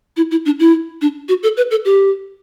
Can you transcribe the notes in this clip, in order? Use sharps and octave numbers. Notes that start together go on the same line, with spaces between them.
E4
E4
D4
E4
D4
F#4
A4
B4
A4
G4